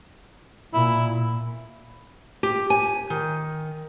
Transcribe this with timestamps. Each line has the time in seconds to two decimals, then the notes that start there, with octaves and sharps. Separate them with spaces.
0.74 A#2 E4
2.43 G4
2.70 G#5
3.10 D#3